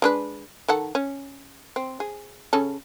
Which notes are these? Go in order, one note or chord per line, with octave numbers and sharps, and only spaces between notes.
G#3 D4 B4
D#3 A4 F#5
C#4
C4
G#4
C#3 C#4 A4